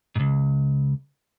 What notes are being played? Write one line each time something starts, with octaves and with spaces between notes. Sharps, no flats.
C#2 G#2